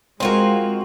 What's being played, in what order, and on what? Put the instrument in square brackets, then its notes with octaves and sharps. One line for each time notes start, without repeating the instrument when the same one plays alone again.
[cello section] G#3 [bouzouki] C4 F4 F#4 [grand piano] A#4 C6